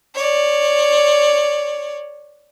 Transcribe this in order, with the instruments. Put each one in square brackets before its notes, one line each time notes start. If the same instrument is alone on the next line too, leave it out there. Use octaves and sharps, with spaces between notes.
[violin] C#5 D5